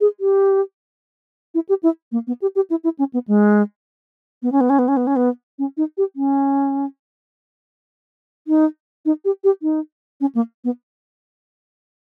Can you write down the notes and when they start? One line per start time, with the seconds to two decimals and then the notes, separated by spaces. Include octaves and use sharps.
0.01 G#4
0.20 G4
1.54 E4
1.69 G4
1.83 E4
2.12 A#3
2.27 B3
2.42 G4
2.55 G4
2.70 E4
2.84 E4
2.99 C#4
3.13 B3
3.28 G#3
4.42 B3
4.52 C#4
4.61 B3
4.70 C#4
4.79 B3
4.88 C#4
4.97 B3
5.07 C#4
5.16 B3
5.59 C#4
5.77 D#4
5.97 G4
6.16 C#4
8.48 D#4
9.05 D#4
9.25 G4
9.44 G4
9.62 D#4
10.21 C#4
10.35 A#3
10.64 B3